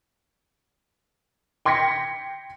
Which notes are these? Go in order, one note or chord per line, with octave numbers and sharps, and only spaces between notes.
G5 C6 G#6 A#6 B6 C#7